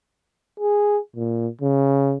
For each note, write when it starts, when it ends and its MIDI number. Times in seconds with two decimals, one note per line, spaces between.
0.60 0.98 68
1.16 1.48 46
1.61 2.16 49